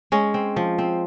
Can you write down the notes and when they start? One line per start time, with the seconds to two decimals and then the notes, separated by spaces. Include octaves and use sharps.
0.12 G#3 C#4
0.34 C4
0.56 F3
0.78 C4